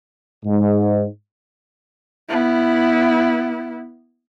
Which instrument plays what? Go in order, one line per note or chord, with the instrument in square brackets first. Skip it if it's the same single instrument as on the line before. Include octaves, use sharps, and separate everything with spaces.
[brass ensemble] G#2
[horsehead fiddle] B3 E4